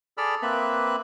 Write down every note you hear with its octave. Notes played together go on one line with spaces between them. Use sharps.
G#4 A4 D5 B5 E6 F6
A#3 C4 B4 E5 F#6